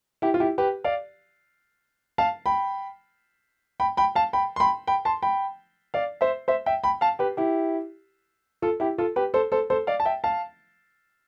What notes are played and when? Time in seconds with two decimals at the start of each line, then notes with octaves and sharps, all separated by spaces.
0.22 E4 G4
0.34 F4
0.40 E4 G4
0.58 G4 B4
0.84 D5 F5
2.18 F5 A5
2.46 G5 B5
3.80 G5 B5
3.97 G5 B5
4.15 F5 A5
4.33 G5 B5
4.56 C6
4.60 G5 B5
4.87 G5 B5
5.05 A5 C6
5.22 G5 B5
5.94 D5 F5
6.21 C5 E5
6.48 C5 E5
6.66 E5 G5
6.83 G5 B5
7.01 F5 A5
7.19 G4 B4
7.37 E4 G4
8.62 F4 A4
8.80 E4 G4
8.98 F4 A4
9.16 G4 B4
9.34 A4 C5
9.52 A4 C5
9.70 A4 C5
9.87 D5 F5
10.00 A5
10.05 E5 G5
10.24 F5 A5